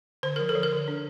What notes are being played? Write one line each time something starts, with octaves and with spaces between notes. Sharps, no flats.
D3 C5
F3 A#4
A4
F3
A#4
D3
D4